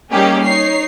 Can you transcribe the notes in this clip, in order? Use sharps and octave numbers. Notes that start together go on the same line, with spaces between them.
G3 A#3 C#4 D#4 G4 G#4
D#4 C#5 C7